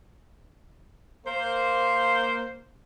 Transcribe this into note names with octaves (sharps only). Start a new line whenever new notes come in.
A#3 C5